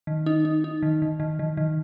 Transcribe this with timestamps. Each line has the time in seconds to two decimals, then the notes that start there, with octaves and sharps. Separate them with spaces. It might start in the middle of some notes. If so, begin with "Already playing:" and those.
0.07 D#3
0.26 D#4
0.45 D#4
0.64 D#4
0.83 D#3
1.02 D#3
1.20 D#3
1.39 D#3
1.57 D#3